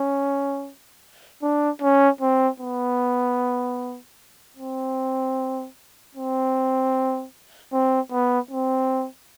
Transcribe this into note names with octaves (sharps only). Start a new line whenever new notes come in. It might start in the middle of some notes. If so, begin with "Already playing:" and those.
Already playing: C#4
D4
C#4
C4
B3
C4
C4
C4
B3
C4